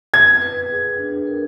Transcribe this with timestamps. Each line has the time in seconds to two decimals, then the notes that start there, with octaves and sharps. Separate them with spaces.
0.14 B4 G#6
0.42 B4
0.70 G#4
0.99 D4
1.27 A#4